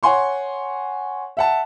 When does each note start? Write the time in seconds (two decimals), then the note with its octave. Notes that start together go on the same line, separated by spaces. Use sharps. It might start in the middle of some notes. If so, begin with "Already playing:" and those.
0.03 C#5 F#5 G#5 C6 C#6
1.37 E5 F#5 A5